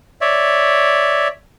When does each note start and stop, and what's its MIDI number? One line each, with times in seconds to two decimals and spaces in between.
0.21 1.28 73
0.21 1.28 74
0.21 1.28 76